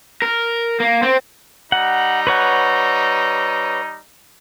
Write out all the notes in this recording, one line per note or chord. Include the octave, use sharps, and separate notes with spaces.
A#4
A#3
C4
G3 D#4 F#5
B4 C#5 F#5